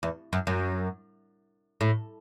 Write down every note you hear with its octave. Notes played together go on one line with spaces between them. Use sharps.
E2
F#2
F#2
A2